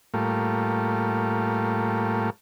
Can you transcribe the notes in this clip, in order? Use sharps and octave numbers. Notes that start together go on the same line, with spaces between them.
A2 G3 A3 A#3 F4